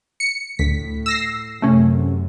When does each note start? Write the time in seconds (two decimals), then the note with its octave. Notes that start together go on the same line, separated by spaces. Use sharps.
0.20 C#7
0.59 D2 A2 B6
1.06 E6 A#6 C7
1.62 F#2 C3 A3 C#4